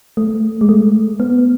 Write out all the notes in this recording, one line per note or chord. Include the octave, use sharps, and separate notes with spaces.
A3
G#3
A3
B3